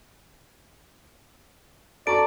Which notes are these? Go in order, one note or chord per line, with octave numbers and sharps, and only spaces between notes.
F#4 A4 D5 A5 A#5 C#6 D7